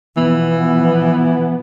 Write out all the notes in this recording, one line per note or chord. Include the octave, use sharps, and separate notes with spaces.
B2 E3 F3 B3